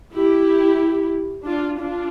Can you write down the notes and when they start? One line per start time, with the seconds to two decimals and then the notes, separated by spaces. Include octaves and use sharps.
0.14 E4 G4
1.46 D4 F4
1.79 D4 F4